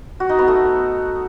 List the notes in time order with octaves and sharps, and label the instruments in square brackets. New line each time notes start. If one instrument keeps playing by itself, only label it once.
[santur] F#4
D#4
B3
A3